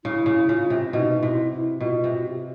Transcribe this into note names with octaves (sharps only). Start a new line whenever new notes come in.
C#3 E4
C#3
C#3 F4
C3
B2 D#4 E4
C3 E4
E4
B2 F4
C3
G4
F#4